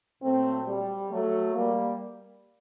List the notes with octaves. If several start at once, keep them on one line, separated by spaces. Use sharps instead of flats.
A#2 F#3 A3 C4
G3
F#3 A3
G3 A#3